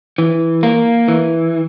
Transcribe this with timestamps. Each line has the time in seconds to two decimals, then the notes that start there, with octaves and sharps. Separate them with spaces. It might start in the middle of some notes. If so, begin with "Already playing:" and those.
0.18 E3
0.63 A#3
1.08 E3